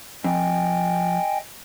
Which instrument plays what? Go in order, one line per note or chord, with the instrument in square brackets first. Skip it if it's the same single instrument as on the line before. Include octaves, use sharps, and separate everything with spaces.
[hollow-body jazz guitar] F2 [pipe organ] D#5 G5 G#5